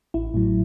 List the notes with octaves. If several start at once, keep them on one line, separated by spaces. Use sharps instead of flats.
A1 E4
A2 F#3